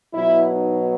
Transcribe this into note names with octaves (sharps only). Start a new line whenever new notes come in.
B2 F#3 B3 E4
D#4